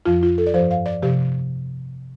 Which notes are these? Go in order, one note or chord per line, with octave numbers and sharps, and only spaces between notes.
F2 F3 F4
F4
A4
D5
G2 F3 C5
F5
D5
C3 F3 G4